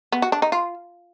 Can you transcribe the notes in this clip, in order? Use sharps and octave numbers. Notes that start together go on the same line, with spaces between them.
B3
F#4
D4
D#4
F4